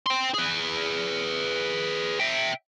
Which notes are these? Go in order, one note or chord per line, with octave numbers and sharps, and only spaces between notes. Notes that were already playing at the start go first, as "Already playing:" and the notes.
G5 C6
G#4 B4
E5 G5